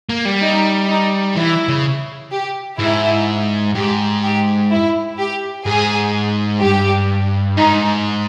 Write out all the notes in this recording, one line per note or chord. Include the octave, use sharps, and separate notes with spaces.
A#3
G3
D#4
D#4
E3 E4
C#3
G4
G#2 E4
G#2 G4
G4
E4
G4
G#2 G#4
G2 G4
G#2 D#4